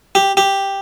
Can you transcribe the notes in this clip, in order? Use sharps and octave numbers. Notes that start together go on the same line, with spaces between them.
G4
G4